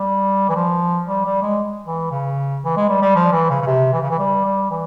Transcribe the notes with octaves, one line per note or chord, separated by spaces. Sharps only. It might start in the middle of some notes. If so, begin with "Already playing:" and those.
Already playing: G3
E3
F3
G3
G3
G#3
E3
C#3
E3
G#3
G3
G3
F3
E3
C#3
C#3
C3
E3
C#3
E3
G3
G3
E3